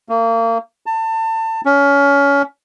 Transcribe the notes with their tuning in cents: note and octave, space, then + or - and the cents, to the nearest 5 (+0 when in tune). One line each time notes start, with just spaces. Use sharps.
A#3 -35
A5 +30
C#4 +25